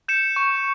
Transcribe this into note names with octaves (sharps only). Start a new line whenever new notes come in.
G6 C#7 E7
C#6